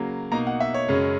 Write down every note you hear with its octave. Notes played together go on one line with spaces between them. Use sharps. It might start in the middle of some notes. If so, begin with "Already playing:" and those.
Already playing: C#3 F#3 A#3
B2 A#3 D#4 A#5
F#5
E5
C#5
F#2 C#3 G#3 C#4